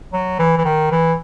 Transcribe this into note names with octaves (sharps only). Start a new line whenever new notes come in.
F#3
E3
E3
D#3
E3